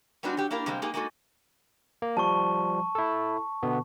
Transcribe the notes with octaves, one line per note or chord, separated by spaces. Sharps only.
G3 G#3 B3 D4 D#4 F#4
F#3 G4
A#3 D4 E4 G4 A#4
C3 G3 G#3 A#3 C4
G#3 A#3 D#4 G4 G#4
G#3 A#3 D#4 F#4 A4
A#3
F3 G3 A5 C#6
E4 A4
B2 D3 B3